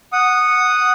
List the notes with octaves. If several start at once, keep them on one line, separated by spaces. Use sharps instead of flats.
F#5 D#6